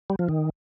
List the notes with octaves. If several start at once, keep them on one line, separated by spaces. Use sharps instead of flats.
G3
F3
D#3